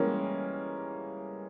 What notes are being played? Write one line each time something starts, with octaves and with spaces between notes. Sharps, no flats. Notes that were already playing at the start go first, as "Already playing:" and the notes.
Already playing: E3 G3 G#3 A#3 C#4